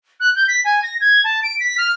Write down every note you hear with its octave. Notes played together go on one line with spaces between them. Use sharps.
F#6
G6
B6
G#5
A#6
G#6
A5
D7
B6
F6